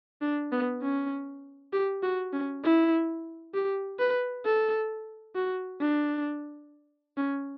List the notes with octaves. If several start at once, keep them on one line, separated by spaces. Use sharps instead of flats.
D4
B3
C#4
G4
F#4
C#4
E4
G4
B4
A4
F#4
D4
C#4